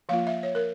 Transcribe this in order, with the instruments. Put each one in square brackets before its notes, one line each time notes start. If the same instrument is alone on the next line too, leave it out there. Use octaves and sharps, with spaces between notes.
[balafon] F3 A#3 F4 F5
E5
C#5
A#4